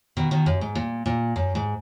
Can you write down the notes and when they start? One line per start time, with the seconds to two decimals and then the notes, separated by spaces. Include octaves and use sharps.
0.17 B2 D#3
0.31 B2 D#3
0.46 F#2
0.61 G#2
0.75 A#2
1.06 A#2
1.36 F#2
1.55 G#2